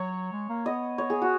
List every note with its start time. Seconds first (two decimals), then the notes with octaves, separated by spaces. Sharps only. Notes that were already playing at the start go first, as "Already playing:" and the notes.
Already playing: F#3 C#5
0.32 G#3
0.49 A#3
0.66 B3 D#5
0.98 C#5
1.10 G#4
1.22 F#4